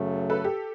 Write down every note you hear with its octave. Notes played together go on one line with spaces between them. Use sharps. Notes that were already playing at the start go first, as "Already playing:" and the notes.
Already playing: F#2 C#3 F#3 A3
A4 B4
G4 A4